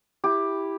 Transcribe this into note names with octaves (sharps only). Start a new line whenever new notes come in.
E4 G4